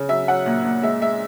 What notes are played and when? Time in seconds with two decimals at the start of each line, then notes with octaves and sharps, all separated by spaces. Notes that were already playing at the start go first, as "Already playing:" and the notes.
Already playing: C#3
0.09 F#3 E5
0.28 F#3 F#5
0.46 A#2
0.64 A#2
0.83 G#3 E5
1.02 G#3 E5